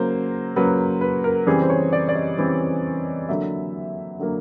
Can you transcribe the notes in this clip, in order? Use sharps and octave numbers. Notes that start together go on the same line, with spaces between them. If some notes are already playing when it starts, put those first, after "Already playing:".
Already playing: C#3 F#3 A#3 C5
C#3 F#3 A#3 B4
B4
A#4
C#3 E3 G3 C4 G#4
C5
C#5
D5
D5
D#5
C#3 E3 G3 C4
D3 F#3 A#3 E5
D3 F#3 A#3